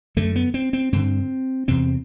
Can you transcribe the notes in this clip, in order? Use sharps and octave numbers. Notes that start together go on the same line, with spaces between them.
F#2 D3 A3
B3
C4
C4
G2 D3 C4
E2 C3 C4